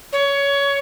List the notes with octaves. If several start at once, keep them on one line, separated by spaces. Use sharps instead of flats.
C#5